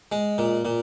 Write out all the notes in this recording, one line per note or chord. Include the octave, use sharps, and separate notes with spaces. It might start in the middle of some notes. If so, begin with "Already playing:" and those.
G#3
A#2
A#2